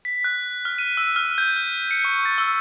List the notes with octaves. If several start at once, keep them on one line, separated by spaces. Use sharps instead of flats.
B6
F#6
F6
D#7
E6
F6
G6
F6
C#7
C#6
A6
E6